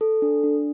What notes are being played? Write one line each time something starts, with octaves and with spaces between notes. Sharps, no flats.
A4
D4
D4